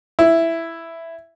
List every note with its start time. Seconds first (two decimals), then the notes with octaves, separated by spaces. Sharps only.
0.19 E4